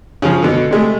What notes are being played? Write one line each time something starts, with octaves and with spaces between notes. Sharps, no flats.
C#3 F3
B2 D3
C3 G#3 A3